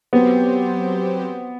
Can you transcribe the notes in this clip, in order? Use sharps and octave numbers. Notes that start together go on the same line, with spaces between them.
F#3 B3 C4 G4 C5